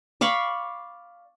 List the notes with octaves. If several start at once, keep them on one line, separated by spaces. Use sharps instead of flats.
D5 F5 B5 C#6